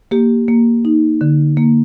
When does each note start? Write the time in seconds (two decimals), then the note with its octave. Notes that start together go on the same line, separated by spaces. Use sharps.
0.11 A#3 G4
0.48 A#3
0.85 D#4
1.21 D3
1.57 A#3